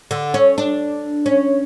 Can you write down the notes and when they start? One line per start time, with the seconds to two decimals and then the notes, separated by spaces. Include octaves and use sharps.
0.11 D3
0.34 C#4
0.58 D4
1.26 C#4